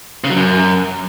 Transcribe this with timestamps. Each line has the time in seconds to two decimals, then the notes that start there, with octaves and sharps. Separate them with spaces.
0.24 C#3
0.30 F#3
0.36 F#2